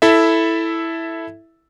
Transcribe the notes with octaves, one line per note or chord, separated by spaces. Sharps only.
E4 A4 E5